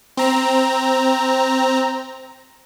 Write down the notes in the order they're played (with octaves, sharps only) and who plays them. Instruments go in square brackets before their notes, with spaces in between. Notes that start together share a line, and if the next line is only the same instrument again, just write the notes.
[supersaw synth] C4 A#5